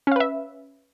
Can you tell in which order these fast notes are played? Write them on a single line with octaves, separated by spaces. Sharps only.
C#4 F5 B4 E5